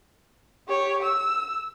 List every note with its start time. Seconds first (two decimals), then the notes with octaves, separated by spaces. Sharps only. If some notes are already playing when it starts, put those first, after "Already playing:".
0.68 G4 C#5
1.03 E6